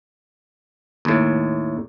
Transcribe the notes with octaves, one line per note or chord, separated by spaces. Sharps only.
D#2 A2